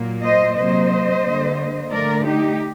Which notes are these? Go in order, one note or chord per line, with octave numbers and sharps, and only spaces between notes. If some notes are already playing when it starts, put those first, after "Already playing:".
Already playing: A#2 F#3 A#3
C5 D#5
C3 F#3 A#3 C5 D#5
D3 G3 A#3
D3 A3 A#4 D5
D#4 G4